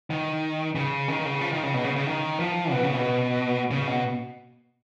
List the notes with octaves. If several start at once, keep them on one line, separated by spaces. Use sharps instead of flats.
D#3
C#3
D#3
C#3
F3
D#3
C#3
B2
C#3
C#3
D#3
F3
B2
C#3
B2
C#3
B2